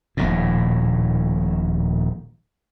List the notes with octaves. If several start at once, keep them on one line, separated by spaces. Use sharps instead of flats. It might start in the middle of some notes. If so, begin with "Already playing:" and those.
D#1 A#1 A2